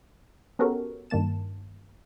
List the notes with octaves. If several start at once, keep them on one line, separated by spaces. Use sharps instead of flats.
B3 C#4 F#4 G4 A4 A#4
G2 D#3 A#3 A5 E7